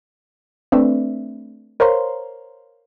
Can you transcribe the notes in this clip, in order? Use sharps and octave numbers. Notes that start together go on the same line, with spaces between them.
A3 C4 D4 B4 D5 E5
A#4 C5 C#5 F5 A#5 C6